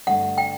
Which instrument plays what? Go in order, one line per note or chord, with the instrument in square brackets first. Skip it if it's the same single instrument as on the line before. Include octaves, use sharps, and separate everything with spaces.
[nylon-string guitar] G2 D3 A3 [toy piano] F#5
[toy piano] G5